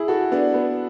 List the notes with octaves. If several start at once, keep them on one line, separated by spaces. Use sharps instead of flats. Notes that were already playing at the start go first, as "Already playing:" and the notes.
Already playing: E4 G#4
F#4 A4
B3 D4
B3